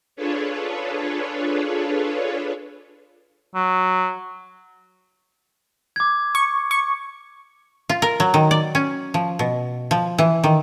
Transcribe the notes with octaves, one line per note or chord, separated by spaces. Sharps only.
D4 F4 G#4 A4 B4 C#5
F#3
D6 G#6
C#6
C#6
F4
A#4
F#3
D#3
D5
C#4
F3
B2
F3
E3
D#3